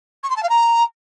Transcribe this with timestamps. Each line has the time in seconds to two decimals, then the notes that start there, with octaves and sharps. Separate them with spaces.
0.23 C#6
0.30 C6
0.36 A5
0.42 F5
0.49 A#5